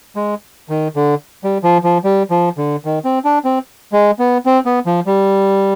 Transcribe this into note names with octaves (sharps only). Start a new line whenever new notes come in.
G#3
D#3
D3
G3
F3
F3
G3
F3
D3
D#3
C4
D4
C4
G#3
B3
C4
B3
F3
G3